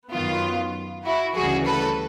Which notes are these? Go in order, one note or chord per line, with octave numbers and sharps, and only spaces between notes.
F#2 D#3 F#3 B3 F4
E4 F#4
D2 C#3 E3 G3 F#4 G#4
A4 B4